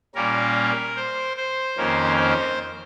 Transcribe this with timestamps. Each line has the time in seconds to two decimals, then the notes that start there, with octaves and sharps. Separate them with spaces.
0.15 A#2 G3 A#3 C#4 A#4
0.96 C5
1.37 C5
1.77 F2 D#3 A#3 C#4
2.17 C5